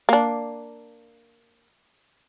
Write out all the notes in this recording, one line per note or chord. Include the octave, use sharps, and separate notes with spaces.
A#3 D4